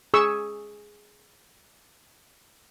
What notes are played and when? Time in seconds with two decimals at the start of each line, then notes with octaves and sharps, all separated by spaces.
0.14 G#4 C#6 E6